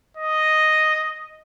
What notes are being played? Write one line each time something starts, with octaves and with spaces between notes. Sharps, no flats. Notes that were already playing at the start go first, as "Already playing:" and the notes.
D#5